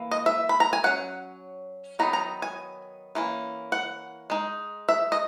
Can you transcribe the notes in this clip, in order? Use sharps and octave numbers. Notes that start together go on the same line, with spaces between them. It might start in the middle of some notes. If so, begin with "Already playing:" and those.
Already playing: E3 A#3
D#5
E5
B5
A#5
G#5
F#3 C#4 F#5
D#3 F#3 B3 D#4 A#5
A#5
G#5
E3 A#3 C#4
F#5
G#3 D#4
E5
D#5